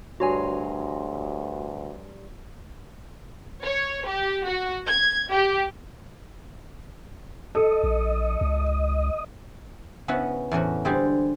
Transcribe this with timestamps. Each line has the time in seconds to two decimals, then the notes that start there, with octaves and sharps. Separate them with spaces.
0.20 D2 G2 F#4 C#5 G#5 A#5 C6
3.65 C#5
4.07 G4
4.48 F#4
4.87 G#6
5.33 G4
7.55 A4 D#5
7.84 A#1
8.41 C#2
10.08 C#3 B3 C#4 E4 F#4 B4
10.51 E2 A2 C#4 F#4
10.85 D3 G3 G#3 G4 G#4 C5